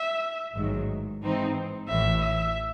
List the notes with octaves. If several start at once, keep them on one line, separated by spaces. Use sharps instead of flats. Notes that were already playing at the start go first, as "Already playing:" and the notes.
Already playing: E5
A1 G#2 D#3 F#3
G#2 E3 C4 D#4
A1 A2 E3 E5
E5